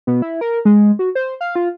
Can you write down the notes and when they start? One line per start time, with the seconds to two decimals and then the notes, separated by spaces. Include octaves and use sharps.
0.07 B2
0.22 E4
0.41 A#4
0.65 G#3
0.99 F#4
1.15 C5
1.41 F5
1.55 F4